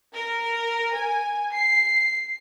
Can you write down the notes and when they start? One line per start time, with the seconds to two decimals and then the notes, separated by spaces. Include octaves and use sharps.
0.13 A#4
0.93 G#5
1.51 C7